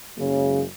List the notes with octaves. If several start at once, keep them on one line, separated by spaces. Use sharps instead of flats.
F#1 F#2 C#3 G#3